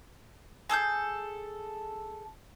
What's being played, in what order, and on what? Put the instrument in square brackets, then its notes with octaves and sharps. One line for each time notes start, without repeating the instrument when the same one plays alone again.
[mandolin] G#4 A4 D#6 G6